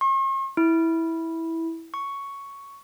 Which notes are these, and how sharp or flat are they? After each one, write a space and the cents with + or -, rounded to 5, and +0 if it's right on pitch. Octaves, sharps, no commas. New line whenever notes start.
C#6 -45
E4 -10
C#6 +5